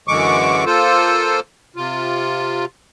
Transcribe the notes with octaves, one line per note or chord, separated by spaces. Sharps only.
F#2 D3 E3 G#3 C#6 D6
A#3 F4 A4 C5
C3 F4